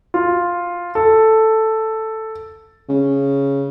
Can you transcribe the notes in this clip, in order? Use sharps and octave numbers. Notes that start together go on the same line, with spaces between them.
F4
A4
C#3